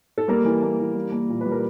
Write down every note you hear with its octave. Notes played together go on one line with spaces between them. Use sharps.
A4
G3 A#3 A#4
E3
A#3
E3
G3
A#3
A#2
G3 B4
A#4